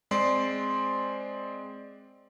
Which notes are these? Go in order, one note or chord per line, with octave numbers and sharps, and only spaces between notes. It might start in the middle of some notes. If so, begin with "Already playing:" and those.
G#3 C4 D5 C6 C7